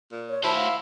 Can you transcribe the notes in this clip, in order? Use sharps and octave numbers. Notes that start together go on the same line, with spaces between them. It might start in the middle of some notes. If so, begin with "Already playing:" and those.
A#2
C#5
E4 F#4 C5 A5
F5